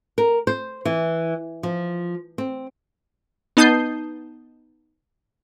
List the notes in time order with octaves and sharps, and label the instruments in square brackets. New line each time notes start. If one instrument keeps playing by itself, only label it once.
[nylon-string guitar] A#4
C5
E3
F3
C4
[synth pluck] B3 D#4 A5 D#6 G6 C7